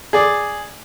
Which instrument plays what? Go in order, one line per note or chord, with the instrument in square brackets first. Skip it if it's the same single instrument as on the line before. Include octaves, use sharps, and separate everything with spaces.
[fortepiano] G#4 D5